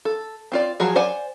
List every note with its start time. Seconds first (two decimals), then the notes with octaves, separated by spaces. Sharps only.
0.05 A4
0.52 C4 F4 D5
0.80 F3 F#3 F#4 G#4
0.96 C5 D5 F#5 G#5